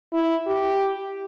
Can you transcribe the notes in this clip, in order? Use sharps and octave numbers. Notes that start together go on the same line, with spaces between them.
E4
G4